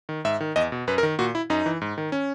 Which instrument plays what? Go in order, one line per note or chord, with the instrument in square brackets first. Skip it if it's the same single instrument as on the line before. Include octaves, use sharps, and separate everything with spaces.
[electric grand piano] D#3
G#2 E5
D#3
E2 D#5
B2
F#2 B4
A#4
D#3
A#2 F#4
E4
F#2 D#4
E3
G#2
D#3
C#4